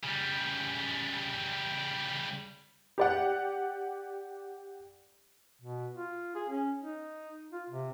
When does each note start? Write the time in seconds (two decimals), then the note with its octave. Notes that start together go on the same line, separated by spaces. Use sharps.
0.04 C#3 G3
2.98 G4 D5 F#5
5.62 B2
5.95 F4
6.35 G#4
6.49 C#4
6.83 D#4
7.52 F4
7.70 C3